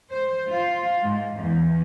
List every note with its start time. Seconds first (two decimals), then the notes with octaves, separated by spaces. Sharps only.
0.11 C5
0.50 F4
1.03 G#2
1.41 E2